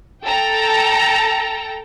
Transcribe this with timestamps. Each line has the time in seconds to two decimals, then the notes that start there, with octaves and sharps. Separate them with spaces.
0.25 A4 G5 A5 A#5